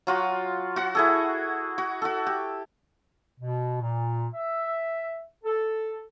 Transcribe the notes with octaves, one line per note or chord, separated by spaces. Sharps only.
F#3 F4 F#4
F#4 F#5
E4 G#4 A4
F#4
F#4 A4
G4
B2
A#2
E5
A4